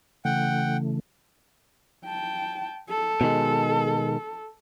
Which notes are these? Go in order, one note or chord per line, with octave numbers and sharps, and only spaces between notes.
C#3 E3 A3 F#5 G5
G5 A5
A4
B2 D#3 G#3